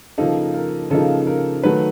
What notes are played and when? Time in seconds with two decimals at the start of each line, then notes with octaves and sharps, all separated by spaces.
0.18 C#3 F3 A#3 D#4 A4
0.54 A#4
0.90 C#3 F3 A#3 D#4 A4
1.27 A#4
1.63 D#3 F#3 A3 B4